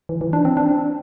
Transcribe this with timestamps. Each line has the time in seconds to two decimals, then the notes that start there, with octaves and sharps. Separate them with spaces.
0.09 E3
0.21 E3
0.33 D4
0.45 C4
0.57 D4